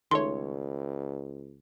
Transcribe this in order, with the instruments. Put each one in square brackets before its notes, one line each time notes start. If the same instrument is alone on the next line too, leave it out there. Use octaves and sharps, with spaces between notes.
[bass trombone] C#2 [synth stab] D#3 A3 C#5 [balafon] C6